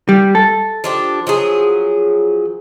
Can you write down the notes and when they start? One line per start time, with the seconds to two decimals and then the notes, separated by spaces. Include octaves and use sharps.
0.09 G3
0.35 A4
0.84 F3 D4 G4
1.27 F3 F#3 G#4